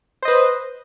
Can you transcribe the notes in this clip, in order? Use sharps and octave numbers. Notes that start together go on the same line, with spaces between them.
B4 C5 D#5